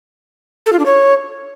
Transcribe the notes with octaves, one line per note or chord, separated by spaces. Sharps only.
A4
F4
D4
C#5